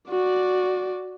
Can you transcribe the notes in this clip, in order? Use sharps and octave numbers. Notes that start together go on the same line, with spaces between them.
F#4 D5